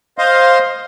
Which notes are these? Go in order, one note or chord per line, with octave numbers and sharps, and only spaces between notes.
C5 D#5 F5 C6